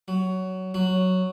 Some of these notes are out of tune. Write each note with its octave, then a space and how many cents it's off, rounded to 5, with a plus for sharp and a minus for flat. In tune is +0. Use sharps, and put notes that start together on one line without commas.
F#3 +15
F#3 +0